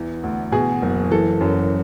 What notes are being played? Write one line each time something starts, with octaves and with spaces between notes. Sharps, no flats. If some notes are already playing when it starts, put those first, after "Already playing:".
Already playing: E2 E3
D2
B2 G#4
F#1
E3 A4
F#2